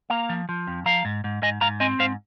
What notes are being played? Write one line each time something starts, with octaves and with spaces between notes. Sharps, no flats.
A#3 F5 A#5
F3
F3
F2
F3 F5 A#5
G#2
G#2
G#2 D#5 G#5
G#2 F5 A#5
C4 D#5 G#5
G#2 C5 F5